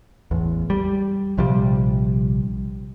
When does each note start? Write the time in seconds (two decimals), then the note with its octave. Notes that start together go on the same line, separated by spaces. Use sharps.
0.31 A1 E2
0.70 G3
1.38 A#1 C3 F3 G3